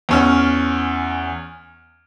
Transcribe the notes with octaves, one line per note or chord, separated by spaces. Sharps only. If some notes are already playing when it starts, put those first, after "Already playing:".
E2 C#4 F6